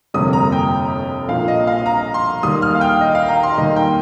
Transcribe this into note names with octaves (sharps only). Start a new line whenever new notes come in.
G1 F2 C3 G3 A#3 D#6
A#5
G5
A#1 A#2 F3 F5
D#5
F5
A#5
C6
D#2 D#3 G3 A#3 D#6
F6
F5
G5
D#5
F5
A#5
C6
D#2 D#3 G3 A#3 D#5
G5